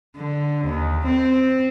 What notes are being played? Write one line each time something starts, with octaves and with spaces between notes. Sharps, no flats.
D3
D#2
C4